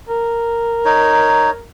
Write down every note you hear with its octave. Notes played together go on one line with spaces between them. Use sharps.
A#4
D#4 C#5